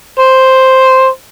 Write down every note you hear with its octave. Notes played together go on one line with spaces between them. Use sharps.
C5